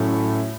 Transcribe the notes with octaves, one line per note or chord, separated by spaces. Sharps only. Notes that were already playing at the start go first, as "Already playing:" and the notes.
Already playing: A2 F#3 A3 C#4